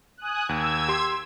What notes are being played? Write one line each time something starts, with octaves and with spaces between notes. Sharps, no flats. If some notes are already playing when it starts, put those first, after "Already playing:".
G#5 D#6 F#6
D#2 E6 G#6
G4 C6